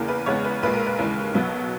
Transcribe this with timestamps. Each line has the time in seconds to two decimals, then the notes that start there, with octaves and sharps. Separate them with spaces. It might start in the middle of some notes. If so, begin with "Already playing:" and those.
Already playing: E2 C#3 E3 A#3
0.08 B4
0.26 E2 C#3 G#3 B3 C#5
0.44 B4
0.62 B1 A#2 G#3 B4
0.74 A#4
0.86 B4
0.99 D#2 C#3 E3 G#3
1.34 B1 B2 F#3 B3